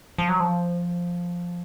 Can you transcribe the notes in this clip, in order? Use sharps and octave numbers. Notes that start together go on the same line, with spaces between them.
F3
F#3
F3